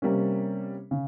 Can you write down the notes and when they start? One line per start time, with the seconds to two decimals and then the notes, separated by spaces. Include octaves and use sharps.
0.02 C3 G3 A#3 C#4
0.91 C#3